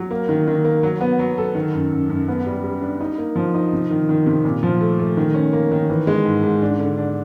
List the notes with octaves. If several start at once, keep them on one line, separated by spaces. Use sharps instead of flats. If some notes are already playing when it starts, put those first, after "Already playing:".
Already playing: F#3
A#3
D#3
D#3
A#3
F#3
B3
F#3
A4
D#3
F#2
F#2
F#2
B3
G3
G3
D4
D#4
A#3
F3
D#4
C3
D#3
D#3
C3
A#2
F3
A3
A3
D#3
C#4
A#3
D#3
E3
G#3
G#2
G#2
D4
D3
D4